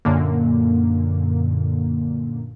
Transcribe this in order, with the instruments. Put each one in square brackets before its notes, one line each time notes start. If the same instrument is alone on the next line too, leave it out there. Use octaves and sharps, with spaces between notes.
[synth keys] F#2 A#2 D3 A#3